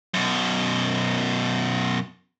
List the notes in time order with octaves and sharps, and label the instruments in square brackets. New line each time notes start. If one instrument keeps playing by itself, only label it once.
[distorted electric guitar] F#2 B2